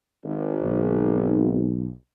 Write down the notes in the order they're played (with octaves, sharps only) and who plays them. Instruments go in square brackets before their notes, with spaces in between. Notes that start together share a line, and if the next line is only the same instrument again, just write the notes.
[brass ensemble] G#1
[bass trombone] B1